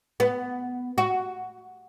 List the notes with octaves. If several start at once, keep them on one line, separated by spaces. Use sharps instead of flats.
B3
F#4